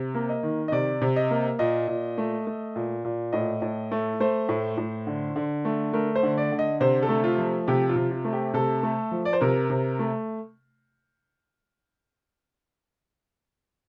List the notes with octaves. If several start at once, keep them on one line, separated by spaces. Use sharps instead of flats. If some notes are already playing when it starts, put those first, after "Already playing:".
Already playing: C3
A#3
D#5
D#3
D#5
C3 D5
C3
D#5
A#3
A#2 D#5
A#2
A3
A3
A#2
A#2
A2 D#5
A2
A3
A3 C5
A2
A2
D3
D3
A3
A3 A#4
C5
D3
D5
D3
D#5
C3 C5
A4
A3
F4
F3
C3 G4
F4
C3
F4
A3
G4
C3 A4
A3
F3
D5
C5
C3 A#4
C3
A3